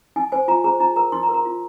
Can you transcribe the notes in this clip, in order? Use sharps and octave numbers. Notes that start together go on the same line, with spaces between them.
D#4 G#5
C5 G#5
F4 A#5
G#4 C5 A#5
D#4 A#5
A#4 A#5
D#4 C6
A#5
A#4
A#5
F4